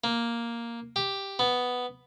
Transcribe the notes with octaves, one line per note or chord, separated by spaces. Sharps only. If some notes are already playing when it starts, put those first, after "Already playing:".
A#3
G4
B3